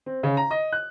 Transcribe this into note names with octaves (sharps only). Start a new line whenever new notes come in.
C4
C#3
A#5
D#5
F#6